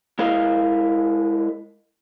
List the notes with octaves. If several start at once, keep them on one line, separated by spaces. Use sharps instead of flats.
G#3 E4 A#4 D#5 F5